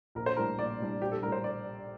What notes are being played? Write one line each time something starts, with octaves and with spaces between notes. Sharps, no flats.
A#1 A#4
C5
A2 G3 D4 A#4
A#1 D5
A2 G3 D4
A#1 G4
A4
A2 G3 D4 A#4
C5
D5